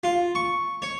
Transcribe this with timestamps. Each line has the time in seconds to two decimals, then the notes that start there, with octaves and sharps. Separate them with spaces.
0.04 F4
0.35 C#6
0.82 C#5